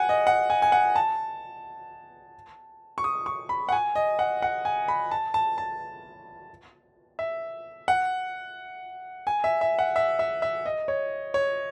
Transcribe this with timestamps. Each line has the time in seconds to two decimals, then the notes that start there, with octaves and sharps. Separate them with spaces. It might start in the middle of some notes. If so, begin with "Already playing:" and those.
Already playing: F#5 G#5
0.09 D#5
0.27 F#5
0.50 G#5
0.62 G#5
0.72 F#5
0.96 A5
2.98 C#6
3.04 D#6
3.26 C#6
3.49 B5
3.69 F#5
3.72 G#5
3.95 D#5
4.19 F#5
4.42 F#5
4.65 G#5
4.88 B5
5.11 A5
5.34 A5
5.58 A5
7.19 E5
7.88 F#5
9.27 G#5
9.44 E5
9.61 E5
9.79 F#5
9.96 E5
10.19 E5
10.42 E5
10.66 D#5
10.88 C#5
11.34 C#5